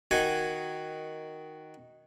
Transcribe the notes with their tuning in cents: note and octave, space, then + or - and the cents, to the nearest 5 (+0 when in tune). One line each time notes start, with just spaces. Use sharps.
D#3 +0 F#4 +0 G#5 +0